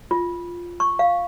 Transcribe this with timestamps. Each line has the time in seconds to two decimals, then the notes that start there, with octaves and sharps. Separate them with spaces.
0.11 F4
0.80 C#6
0.99 F5